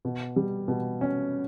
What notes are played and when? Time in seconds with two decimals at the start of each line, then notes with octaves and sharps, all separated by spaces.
0.05 B2
0.36 G3
0.68 B2
1.01 C#4